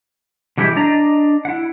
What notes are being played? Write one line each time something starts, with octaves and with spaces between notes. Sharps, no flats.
B2 E3 G3 G#3 E4 G4
D4 D5 D#5 A#5
E4 F#5